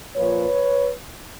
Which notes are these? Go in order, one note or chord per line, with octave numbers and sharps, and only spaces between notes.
A#2 F3 B4 C#5